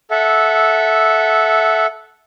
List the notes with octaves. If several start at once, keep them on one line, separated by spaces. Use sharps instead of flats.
A4 E5 F#5